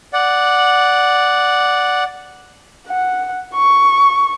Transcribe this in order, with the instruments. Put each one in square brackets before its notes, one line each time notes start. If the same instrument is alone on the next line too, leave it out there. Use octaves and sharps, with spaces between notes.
[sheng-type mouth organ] D5 F#5
[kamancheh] F#5
C#6